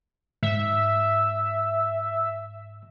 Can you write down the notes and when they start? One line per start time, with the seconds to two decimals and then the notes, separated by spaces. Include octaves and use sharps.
0.43 G#2 E5